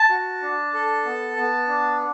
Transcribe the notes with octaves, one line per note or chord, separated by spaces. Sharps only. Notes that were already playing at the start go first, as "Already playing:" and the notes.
Already playing: A5
F#4
D4
A4
B3
B3
D4